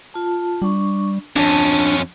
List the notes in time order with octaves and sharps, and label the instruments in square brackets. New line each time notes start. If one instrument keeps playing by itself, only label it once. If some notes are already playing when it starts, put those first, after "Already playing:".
[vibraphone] F4 A5
[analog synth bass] G3 [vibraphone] D4 C#6
[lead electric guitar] F2 C#4 [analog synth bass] D4 [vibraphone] A5